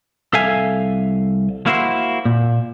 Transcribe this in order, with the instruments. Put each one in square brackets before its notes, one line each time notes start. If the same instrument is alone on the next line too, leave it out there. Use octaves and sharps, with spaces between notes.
[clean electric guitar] C2 A4 E5 F5 G#5
A#3 E4 F#4 C5
A#2